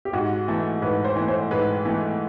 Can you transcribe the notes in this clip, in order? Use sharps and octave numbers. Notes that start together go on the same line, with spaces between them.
G4
G#2 F#4
E3 A3
G#2 B4
C5
E3 A3
C5
G#2 B4
E3 A3